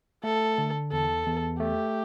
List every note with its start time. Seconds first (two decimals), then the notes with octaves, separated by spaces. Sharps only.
0.24 A3 A4
0.58 D3
0.92 E2 A4
1.26 E2
1.60 A3 G4